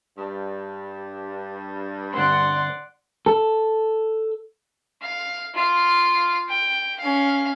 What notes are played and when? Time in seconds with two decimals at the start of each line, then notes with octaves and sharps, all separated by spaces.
0.17 G2
2.14 G1 C4 D5 F#5 C6
3.26 A4
5.02 F5
5.55 F4 F5
6.49 G5
7.00 C#4 F5